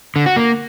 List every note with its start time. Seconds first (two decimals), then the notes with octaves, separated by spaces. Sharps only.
0.16 D3
0.26 F#4
0.36 A#3